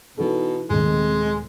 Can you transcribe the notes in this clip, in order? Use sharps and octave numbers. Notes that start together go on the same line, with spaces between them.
B2 E3 D#4 A4
D#1 C3 D#3 G#3 C4